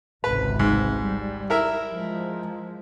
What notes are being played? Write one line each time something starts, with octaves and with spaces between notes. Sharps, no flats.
G#1 C#2 C3 B4
G#2
G3
E4 A#4 E5
F3 G#3